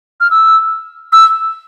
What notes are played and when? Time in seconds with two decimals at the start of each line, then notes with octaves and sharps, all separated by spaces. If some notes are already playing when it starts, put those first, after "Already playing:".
0.21 F6
0.31 E6
1.13 E6